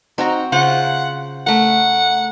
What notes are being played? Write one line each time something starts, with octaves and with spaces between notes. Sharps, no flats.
C4 D#4 F#4 A#5
C#3 F4 C5 F#5
A3 A#4 F#5